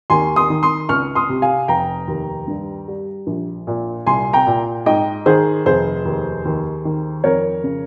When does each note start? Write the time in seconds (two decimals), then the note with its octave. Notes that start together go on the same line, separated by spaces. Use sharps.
0.10 D#2 G#5 C6
0.36 C6 D#6
0.50 D#3
0.63 C6 D#6
0.89 C#2 C#6 F6
1.15 C6 D#6
1.29 C3
1.42 F5 G#5
1.68 F1 G5 A#5
2.08 D#2
2.48 G2
2.88 G3
3.27 A#1
3.67 A#2
4.07 C2 G#5 C6
4.33 G5 A#5
4.46 A#2
4.86 G#2 D#5 G5
5.26 D#3 G#4 C5
5.66 F1 G#4 C5
6.05 D#2
6.45 D#2
6.85 D#3
7.24 F2 A#4 C#5
7.64 C#3